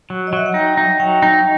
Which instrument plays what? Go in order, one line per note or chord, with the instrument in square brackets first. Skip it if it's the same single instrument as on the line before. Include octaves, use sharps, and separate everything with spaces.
[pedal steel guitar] F#3
[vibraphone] D#5
[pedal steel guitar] F#3 [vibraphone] E5
[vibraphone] F#5
[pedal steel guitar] D#4 [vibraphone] G5
[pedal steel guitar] D#4
[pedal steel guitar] F#3 [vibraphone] G5
[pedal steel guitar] D#4 [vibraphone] G5